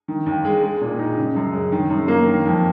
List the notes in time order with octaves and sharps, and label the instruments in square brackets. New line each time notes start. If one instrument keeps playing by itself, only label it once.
[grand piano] D#3
D#2
G#3
G#3
A#2
D#4
C#3
F#2
G#3
D#3
F#2
A#3
D#3
F2